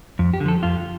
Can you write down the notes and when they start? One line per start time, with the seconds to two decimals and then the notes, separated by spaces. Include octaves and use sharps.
0.19 F2
0.34 G4
0.40 D3
0.46 F3 A4
0.63 F2 F4